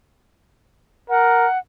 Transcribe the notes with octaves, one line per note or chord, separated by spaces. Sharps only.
A#4 F#5